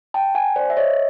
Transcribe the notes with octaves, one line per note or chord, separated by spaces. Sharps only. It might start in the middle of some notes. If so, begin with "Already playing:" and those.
G5 A5
F#5 G#5
C5 D5
E5
C#5 D#5